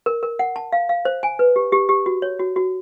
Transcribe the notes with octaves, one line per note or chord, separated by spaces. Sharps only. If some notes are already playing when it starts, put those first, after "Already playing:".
A#4
A#4
F#5
A5
F5
F5
C5
G#5
B4
G4
G4
G4
F#4
C#5
F#4
F#4